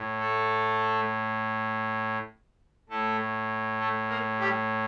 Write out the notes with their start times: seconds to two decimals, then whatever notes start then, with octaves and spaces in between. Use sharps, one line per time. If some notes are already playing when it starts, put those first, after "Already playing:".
Already playing: A2
0.20 A3 A4
2.90 A2 A3 A4
3.79 A3 A4
4.09 A#3 A#4
4.39 G3 G4